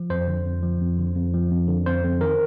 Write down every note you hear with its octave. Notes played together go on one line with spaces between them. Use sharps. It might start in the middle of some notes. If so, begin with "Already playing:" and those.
Already playing: F3
F2 C5
D3
F2
F3
F2
D3
F2
F3
F2
D3
F2 C5
F2
D#3 A#4